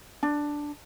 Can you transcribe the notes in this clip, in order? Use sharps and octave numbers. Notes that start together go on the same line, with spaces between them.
D4